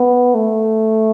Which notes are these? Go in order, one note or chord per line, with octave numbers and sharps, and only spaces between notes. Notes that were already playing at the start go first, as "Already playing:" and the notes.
Already playing: B3
A3